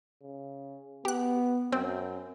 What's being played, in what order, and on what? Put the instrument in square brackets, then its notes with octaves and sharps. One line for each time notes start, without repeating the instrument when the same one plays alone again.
[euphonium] C#3
[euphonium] B3 [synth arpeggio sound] G4 F#6
[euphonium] F#2 [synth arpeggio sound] C4